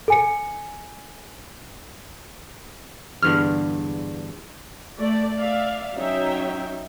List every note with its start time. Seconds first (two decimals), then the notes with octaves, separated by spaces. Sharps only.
0.08 A4 G#5 C#7
3.22 E2 G2 D3 F6
4.99 A3 D5
5.38 D5 E5 F5
5.96 F#3 C#4 D#4 E5 G5